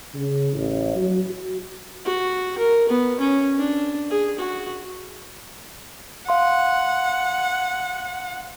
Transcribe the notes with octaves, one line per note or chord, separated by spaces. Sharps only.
C#3
A1
F#3
F#4
F#4
A#4
B3
C#4
D4
G#4
F#4
F5 F#5 C6